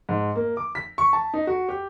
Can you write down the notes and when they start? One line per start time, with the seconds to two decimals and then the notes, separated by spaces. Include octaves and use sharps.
0.09 G#2
0.36 A#3
0.57 D6
0.75 B6
0.98 C#6
1.13 A5
1.34 D#4
1.47 F#4
1.69 G4